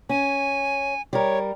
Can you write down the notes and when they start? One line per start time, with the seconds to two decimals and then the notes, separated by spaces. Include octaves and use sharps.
0.09 C#4 G#5
1.13 G3 A#4 C#5